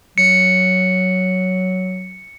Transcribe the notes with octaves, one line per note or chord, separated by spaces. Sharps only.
F#3 C#7